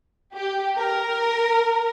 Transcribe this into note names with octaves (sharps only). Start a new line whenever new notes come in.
G4
A#4